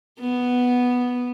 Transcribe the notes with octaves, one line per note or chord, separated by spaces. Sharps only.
B3